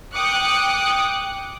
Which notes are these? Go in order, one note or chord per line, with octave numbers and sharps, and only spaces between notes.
G5 D6 D#6 F#6 C#7